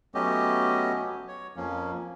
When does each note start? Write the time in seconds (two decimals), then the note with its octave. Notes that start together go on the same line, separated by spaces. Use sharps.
0.15 F#3 A3 B3 C#4 G4 D#5
0.95 F#3
1.28 C#5
1.56 F2 F3 A#3 C#4